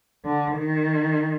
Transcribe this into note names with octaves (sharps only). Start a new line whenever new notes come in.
D3
D#3